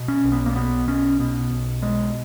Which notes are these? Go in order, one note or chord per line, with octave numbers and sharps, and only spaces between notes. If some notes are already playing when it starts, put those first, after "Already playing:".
Already playing: B2
C#4
B1
B3
A#3
B2 B3
B1 C#4
B2 B3
B1
B2 G#3